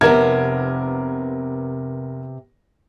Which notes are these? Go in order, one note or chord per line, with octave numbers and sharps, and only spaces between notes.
F1 C3 B3 A#4 G#6